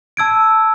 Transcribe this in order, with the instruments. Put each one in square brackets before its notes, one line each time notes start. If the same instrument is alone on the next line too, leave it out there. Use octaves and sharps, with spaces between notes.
[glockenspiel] A5 E6 G#6 D7